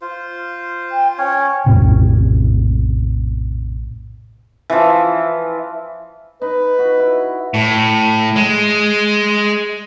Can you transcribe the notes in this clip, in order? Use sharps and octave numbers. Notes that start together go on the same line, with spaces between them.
F4 C5
G5
C#4 C#5 G5
A#1 F2 A2 C3
E3 F3
D#4 B4
F#4
E4
A2
G#3